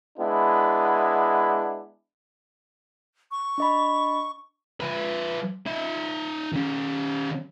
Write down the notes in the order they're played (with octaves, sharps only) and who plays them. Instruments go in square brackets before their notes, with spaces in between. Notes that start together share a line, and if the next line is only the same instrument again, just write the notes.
[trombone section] G#3 B3 D4 E4
[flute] C#6
[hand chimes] D4 D#5 B5
[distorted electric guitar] F3 B4
D#4 E5
D#3 C#4